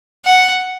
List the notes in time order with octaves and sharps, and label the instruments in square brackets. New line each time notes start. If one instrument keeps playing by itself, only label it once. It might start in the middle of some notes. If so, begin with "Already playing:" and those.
[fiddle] F#5